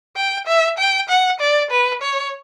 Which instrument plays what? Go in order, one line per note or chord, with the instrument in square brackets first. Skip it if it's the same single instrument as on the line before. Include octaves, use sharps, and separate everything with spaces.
[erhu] G5
E5
G5
F#5
D5
B4
C#5